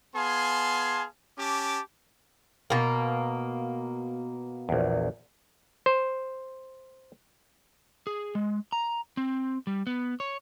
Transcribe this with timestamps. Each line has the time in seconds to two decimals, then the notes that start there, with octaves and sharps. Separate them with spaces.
0.15 B3 G#4 F5 G#5 A5 C6
1.38 C#4 G4 A5 D6
2.70 B2 A#3
4.69 A#1 E2
5.86 C5
8.07 G#4
8.35 G#3
8.72 A#5
9.17 C4
9.67 G3
9.87 B3
10.20 C#5